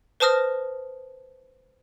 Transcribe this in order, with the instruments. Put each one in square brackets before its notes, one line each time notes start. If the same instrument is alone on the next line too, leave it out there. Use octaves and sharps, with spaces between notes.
[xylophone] B4 C5 A5 D#6 F6 A#6